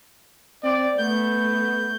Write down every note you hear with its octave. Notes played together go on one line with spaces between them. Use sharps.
C4 D5
A3 B3 G6